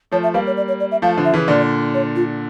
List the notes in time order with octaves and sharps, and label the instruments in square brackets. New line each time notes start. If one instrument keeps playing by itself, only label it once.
[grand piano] F3 A3 [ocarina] C#5
[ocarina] E5
[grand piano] G3 A#3 [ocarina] F5
[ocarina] C#5
D5
C#5
D5
E5
[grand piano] F3 A3 [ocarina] F5
[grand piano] D3 F3
[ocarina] E5
[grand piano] C#3 E3
[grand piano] A#2 D3 [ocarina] D5
[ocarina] C#5
F4